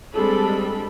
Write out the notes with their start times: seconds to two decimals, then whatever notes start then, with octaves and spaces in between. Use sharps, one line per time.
0.15 G3 G#3 C4 D4 A4 B5